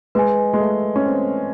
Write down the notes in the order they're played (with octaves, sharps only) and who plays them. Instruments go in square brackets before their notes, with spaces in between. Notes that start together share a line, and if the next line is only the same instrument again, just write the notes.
[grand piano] G#3 [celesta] B4 D#5 G#5
[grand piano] G#3
A3
C#4
C4